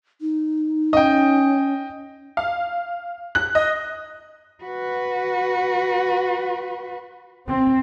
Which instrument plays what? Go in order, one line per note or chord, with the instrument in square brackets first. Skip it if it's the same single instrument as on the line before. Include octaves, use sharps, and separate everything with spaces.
[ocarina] D#4
[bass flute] C#4 [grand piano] D#5 G5
[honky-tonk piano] F5
F#6
D#5
[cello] F#4 B4
[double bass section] C4